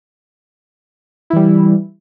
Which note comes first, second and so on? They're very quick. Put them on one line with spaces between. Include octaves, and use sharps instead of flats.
E4 E3 G3